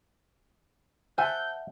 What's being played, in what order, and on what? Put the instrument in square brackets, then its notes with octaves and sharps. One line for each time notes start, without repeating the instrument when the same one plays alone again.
[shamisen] C5 G#5 [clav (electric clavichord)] E5 F#5 A5 [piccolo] G6